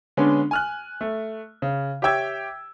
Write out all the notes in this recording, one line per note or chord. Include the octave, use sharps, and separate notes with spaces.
D3 G#3 B3 C#4 D4
G#5 F6 F#6
A3
C#3
G4 C#5 E5 G5 E6 G#6